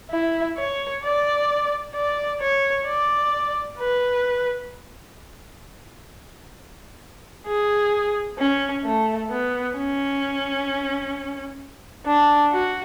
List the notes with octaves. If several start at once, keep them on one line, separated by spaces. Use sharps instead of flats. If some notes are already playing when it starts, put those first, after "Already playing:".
E4
C#5
D5
D5
C#5
D5
B4
G#4
C#4
A3
B3
C#4
D4
F#4